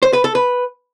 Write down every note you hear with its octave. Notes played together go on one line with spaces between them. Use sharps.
C5
B4
A4
B4